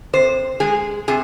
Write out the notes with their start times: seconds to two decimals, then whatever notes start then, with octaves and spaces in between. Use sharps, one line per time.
0.13 C3 C5
0.60 G#3 G#4
1.08 C3 G#4